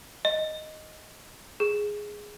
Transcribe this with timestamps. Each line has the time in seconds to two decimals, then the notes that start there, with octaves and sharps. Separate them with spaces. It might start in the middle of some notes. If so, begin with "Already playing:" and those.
0.25 D#5
1.60 G#4